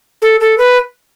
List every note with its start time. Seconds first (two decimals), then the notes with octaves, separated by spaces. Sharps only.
0.22 A4
0.40 A4
0.58 B4